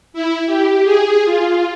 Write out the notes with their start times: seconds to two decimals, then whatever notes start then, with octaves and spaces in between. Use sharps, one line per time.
0.13 E4
0.46 G4
0.84 G#4
1.25 F4